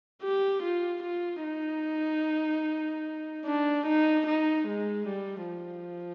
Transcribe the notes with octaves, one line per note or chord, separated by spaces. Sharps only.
G4
F4
F4
D#4
D4
D#4
D#4
G#3
G3
F3